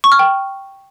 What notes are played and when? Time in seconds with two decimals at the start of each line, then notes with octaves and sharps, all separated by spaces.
0.04 C#6
0.12 F6
0.19 G5